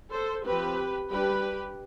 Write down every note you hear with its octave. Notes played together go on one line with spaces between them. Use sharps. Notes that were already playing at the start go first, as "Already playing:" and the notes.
A4 C5
F3 C4 G4 B4
G3 D4 G4 B4